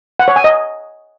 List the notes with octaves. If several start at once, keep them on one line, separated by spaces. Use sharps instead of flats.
F#5
C#5
G#5
D#5